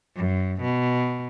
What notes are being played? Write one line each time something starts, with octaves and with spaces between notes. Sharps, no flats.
F#2
B2